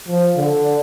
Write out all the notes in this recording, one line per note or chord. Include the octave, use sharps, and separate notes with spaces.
F3
D3